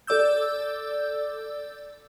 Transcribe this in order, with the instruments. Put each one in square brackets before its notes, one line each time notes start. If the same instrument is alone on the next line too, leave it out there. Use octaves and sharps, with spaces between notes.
[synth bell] A4 D5 D6 E6 G6